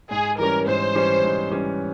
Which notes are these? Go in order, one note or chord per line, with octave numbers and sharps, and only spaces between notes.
G#2 G#4
E3 G3 C#4 A#4
G#2 C5
E3 G3 C#4
G#2
E3 G3 C#4